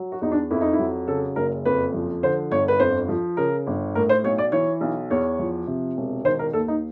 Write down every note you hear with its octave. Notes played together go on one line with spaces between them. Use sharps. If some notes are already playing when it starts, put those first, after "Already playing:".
Already playing: F#3
F#4
E2 D#4
D4
F2 E4
D#4
E4
F#3
C#3 A4
F#1 A#4
F2 B4
F3
D3 C5
G1 C#5
B4
F2 C5
F3
C#3 A#4
G1
A2 A#4
C5
B1 C#5
D5
E3 C#5
B1
E2 C#5
F3
C3
E1
D#3 C5
A#4
D#2 A4
D#4